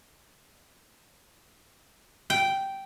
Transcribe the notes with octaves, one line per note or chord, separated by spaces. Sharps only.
G5